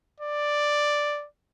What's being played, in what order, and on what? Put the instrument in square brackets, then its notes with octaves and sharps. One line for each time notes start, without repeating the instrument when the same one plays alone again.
[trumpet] D5